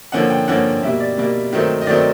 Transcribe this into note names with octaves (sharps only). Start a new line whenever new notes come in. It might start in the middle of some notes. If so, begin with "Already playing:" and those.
D3 F3 A#3 C#4 F#5
G5
D3 F3 A#3 C#4 F#5
B2 G3 A#3 E5
D5
B2 G3 A#3
D#3 F#3 A3 C4
D#5
D#3 F#3 A3 C4 D5